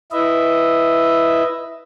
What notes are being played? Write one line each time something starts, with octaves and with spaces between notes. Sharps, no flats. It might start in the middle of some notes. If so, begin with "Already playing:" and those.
E4 B4 D#5 E5